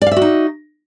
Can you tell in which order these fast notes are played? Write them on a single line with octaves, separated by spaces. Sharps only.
D5 F5 E5 F#4 D#4